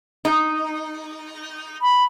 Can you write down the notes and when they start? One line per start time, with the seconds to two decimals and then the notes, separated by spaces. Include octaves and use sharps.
0.25 D#4
1.82 B5